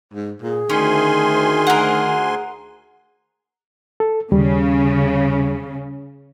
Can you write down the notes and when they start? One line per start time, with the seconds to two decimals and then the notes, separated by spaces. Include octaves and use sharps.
0.13 G#2
0.42 A#2 G#4
0.70 D2 D#3 C#4 G#5 C6
1.67 A#4 F#5
4.00 A4
4.32 D#2 C#3 G3